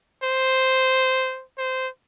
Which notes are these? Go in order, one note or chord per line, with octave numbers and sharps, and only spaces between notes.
C5
C5